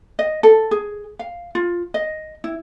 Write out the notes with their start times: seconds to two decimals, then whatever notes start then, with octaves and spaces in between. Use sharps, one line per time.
0.19 D#5
0.43 A4
0.71 G#4
1.19 F5
1.55 F4
1.94 D#5
2.44 E4